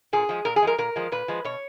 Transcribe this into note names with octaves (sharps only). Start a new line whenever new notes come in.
A#2 G#4
F3 G#3
A#2 A#4
G#4
F3 G#3 A#4
A#2 A#4
F3 G#3
A#2 B4
F3 G#3
B2 C#5